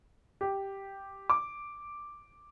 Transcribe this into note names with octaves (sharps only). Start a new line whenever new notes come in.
G4
D6